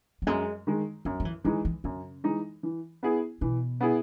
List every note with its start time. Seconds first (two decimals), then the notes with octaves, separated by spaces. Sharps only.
0.22 F#3
0.27 F#2 G#3
0.67 D#3 G#3
1.05 F#2 F#3
1.20 F#3
1.25 E3
1.44 D#3 E3 G#3 D#4
1.65 E3
1.84 F#2 C#3
2.24 E3 G#3 D#4
2.63 E3
3.03 B3 E4 G#4
3.41 B2 E3
3.81 B3 E4 G#4